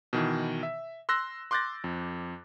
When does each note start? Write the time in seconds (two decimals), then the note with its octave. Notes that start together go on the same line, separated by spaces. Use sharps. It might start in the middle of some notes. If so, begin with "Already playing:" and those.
0.13 B2 D#3 E3
0.63 E5
1.09 C6 E6 F#6 A#6
1.51 C6 D6 F#6 G6 A6 A#6
1.84 F2